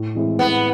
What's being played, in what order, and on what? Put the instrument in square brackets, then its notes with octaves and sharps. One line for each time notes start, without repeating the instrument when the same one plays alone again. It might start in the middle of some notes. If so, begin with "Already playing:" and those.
Already playing: [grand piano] A2
E3 G#3 C4 E4
[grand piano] A2 [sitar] B3